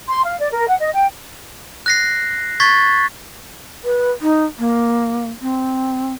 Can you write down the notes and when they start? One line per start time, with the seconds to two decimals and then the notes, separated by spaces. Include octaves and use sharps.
0.08 C6
0.25 F5
0.40 D5
0.51 A#4
0.68 F#5
0.80 D#5
0.93 G5
1.86 F#6 A#6 C7
2.60 C#6 G#6 A6 B6
3.84 B4
4.22 D#4
4.59 A#3
5.41 C4